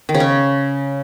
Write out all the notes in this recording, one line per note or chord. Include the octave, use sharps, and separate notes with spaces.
D#3
C#3
C#4